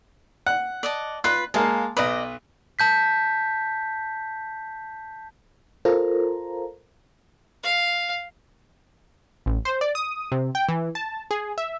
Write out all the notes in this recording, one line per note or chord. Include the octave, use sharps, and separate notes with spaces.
F#5
D5 D#5 A5
F4 B4 F#6
G#3 A#3 F5 A5
B1 B4 D5 D#5 A#5
A5 G6 B6
F4 A4 A#4 C5 A#5
F5
A1
C5
D5
D#6
C3
G5
E3
A5
G#4
E5